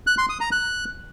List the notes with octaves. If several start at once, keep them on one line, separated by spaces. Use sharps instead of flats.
F#6
C6
D#6
A#5
F#6